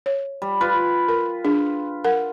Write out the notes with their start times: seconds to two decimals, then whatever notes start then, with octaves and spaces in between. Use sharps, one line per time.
0.06 C#5
0.42 G3
0.61 F4 B4
1.08 A#4
1.45 D4 G#4
2.04 A#4 F#5